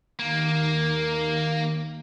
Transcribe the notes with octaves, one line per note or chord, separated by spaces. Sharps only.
D#2 D#3 A#3